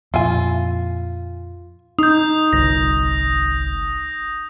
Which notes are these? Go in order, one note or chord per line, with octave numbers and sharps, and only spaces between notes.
F2 A#2 E4 F4 G#5
D#4 D#6 G6
G1 C2 A#6